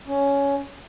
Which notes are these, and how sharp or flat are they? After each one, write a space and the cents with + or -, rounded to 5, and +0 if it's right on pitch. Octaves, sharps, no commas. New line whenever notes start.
C#4 +10